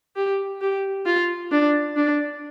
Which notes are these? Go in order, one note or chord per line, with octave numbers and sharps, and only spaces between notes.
G4
G4
F4
D4
D4